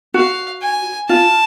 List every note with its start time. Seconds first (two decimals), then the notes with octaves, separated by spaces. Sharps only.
0.14 F#4 F5
0.62 G#5
1.09 F4 A5